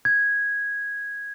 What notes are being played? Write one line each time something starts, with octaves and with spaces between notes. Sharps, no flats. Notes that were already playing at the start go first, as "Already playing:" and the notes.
G#6